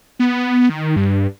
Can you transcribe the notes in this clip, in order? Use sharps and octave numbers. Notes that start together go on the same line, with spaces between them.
B3
D#3
G2